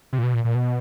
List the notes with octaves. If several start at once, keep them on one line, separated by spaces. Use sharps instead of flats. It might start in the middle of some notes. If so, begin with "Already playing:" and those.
C3
A#2
B2
A#2
A#2
B2